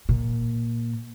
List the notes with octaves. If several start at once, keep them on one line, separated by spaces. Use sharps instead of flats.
A#2